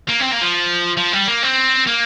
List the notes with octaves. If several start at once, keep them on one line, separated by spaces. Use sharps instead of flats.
A#3
C4
A#3
F3
F3
G3
A#3
C4
A#3